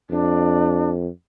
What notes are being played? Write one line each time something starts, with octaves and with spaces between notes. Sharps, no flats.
F2 D4